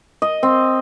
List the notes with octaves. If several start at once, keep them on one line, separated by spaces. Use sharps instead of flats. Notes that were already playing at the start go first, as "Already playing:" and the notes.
D#5
C4